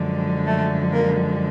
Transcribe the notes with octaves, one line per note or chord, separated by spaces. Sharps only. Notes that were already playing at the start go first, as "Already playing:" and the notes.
Already playing: F#2 D3 F3 G#3
A3
A#3